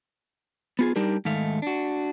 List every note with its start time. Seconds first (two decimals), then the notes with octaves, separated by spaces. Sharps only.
0.79 B3 F4 G#4
0.96 G3 D4 D#4 G4 A#4
1.25 G#2 D#3 A3 F5
1.62 D4 F#4